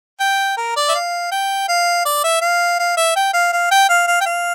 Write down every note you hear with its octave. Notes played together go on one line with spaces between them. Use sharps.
G5
A#4
D5
E5
F5
G5
F5
D5
E5
F5
F5
E5
G5
F5
F5
G5
F5
F5
G5
F5